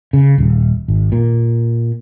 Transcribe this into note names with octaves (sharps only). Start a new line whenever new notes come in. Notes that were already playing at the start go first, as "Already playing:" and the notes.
C#3
D#1
G#1
A#2